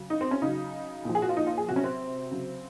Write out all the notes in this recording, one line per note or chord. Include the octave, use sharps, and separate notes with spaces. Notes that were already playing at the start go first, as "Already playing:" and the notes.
Already playing: C#3 F#3
D#4
C4
C#4
C#3 F#3 D#4
A#2 F3
G#4
F#4
F4
D#4
F4
G#4
C3 F#3 F#4
C#4
C4
C#3 F#3